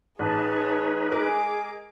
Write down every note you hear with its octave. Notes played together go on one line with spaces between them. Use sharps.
A1 D#4 G#4 B4 C#5 A5
G#3 G#4 A#4 D6